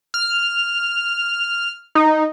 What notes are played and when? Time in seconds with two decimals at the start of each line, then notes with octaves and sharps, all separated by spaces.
0.14 F6
1.95 D#4